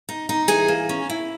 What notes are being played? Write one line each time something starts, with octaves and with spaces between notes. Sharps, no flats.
D#4
D#4
E3 G#4 G#5
A#3
C#4
E4